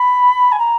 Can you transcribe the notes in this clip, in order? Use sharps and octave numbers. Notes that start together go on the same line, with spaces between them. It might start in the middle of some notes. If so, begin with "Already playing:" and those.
Already playing: B5
G#5
A#5